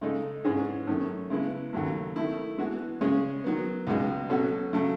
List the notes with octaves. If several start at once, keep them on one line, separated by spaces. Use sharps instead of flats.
C#3 G#3 D#4 A4
G#2 E3 G#3 C#4 G#4
F#2 D#3 A3 C#4
C#3 G#3 B3 E4
D#2 C#3 F#3 A3
D#3 A3 E4
E3 G#3 B3 F#4
C#3 G#3 C#4 G#4
D#3 F#3 B3
C#2 B2 G#3 D#4
B2 F#3 C#4 F#4 A4
C#3 F#3 A3